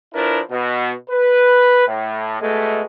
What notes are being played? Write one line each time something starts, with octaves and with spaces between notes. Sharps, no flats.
F3 D4 E4 A#4 B4
B2
B4
A2
B2 G#3 A3